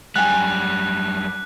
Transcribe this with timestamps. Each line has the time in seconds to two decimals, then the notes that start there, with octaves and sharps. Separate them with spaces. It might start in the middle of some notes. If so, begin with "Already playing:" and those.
0.16 F#2 G3 G5 G#5 F#6